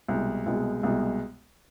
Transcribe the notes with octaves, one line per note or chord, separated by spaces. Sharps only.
C2 B2 G#3
C2 B2 G#3
C2 B2 G#3